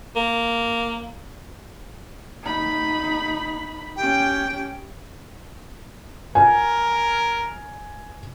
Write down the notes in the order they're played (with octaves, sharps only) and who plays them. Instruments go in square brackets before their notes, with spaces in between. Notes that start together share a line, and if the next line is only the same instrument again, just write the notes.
[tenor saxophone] A#3
[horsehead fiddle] D#4 B5
[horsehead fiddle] C#4 G4 [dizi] G5
[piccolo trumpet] A#4 [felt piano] G#5